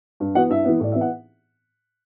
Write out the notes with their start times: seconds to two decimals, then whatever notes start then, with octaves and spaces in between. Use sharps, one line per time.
0.20 G2
0.35 E3 B3 F#4 F#5
0.50 G2 E4 E5
0.65 E3 B3
0.80 A2 D5
0.92 E3 B3 E5
1.01 F#5